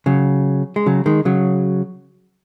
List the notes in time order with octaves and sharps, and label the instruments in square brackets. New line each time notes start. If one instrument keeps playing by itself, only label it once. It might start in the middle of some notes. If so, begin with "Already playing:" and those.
[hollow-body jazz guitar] C#3 F#3
G#3
C#3 F#3
D#3 G#3
C#3 F#3